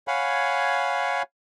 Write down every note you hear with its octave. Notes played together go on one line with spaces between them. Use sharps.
C#5 F5 F#5 G#5 B5